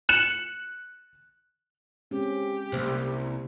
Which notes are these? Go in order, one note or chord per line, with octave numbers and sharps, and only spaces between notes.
F#6 C#7 E7 F#7
G#3 C4 C#4 G4
C2 F#3 A#3 C5